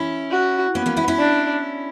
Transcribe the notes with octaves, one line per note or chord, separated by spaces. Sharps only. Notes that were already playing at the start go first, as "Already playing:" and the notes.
Already playing: C#4 E4
F#4
A#3 B3 C#4
A#3 C#4
C#4 E4
C#4 E4
D4